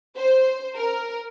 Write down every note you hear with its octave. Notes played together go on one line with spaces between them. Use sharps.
C5
A#4